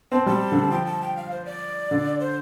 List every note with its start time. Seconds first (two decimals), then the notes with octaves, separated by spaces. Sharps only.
0.12 C4 A5
0.26 G3 A5
0.52 D3
0.62 D3
0.71 F3 G5
0.86 A5
1.02 G5
1.17 F5
1.31 C5
1.45 D5
1.91 D3
2.20 C5